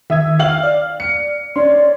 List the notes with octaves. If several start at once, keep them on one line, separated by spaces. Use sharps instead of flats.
D#3 E5 D#6 G#6
F5 G5 F6 F#7
D5
C#7
C#4 D5 C6